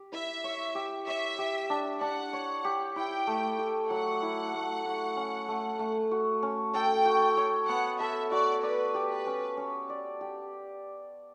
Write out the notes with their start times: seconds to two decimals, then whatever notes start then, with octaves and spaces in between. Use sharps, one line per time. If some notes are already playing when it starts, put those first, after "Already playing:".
Already playing: G4
0.12 E4 E5
0.44 C#5
0.75 G4
1.07 C#5 E5
1.38 G4
1.70 D4
2.01 D4 F#5
2.33 C#5
2.65 G4
2.96 E4 G5
3.27 A3
3.59 G4
3.90 F#3 F#5
4.22 E4
4.53 A3
4.85 F#4
5.17 C#4
5.48 A3
5.79 A3
6.11 F#4
6.43 C#4
6.73 A4 G5
7.06 F#4
7.37 C#5
7.68 B3 F#5
7.99 A4 E5
8.32 F#4 D5
8.63 B4 D5
8.94 G4
9.11 B4
9.27 C#4
9.57 C#4
9.89 D5
10.21 G4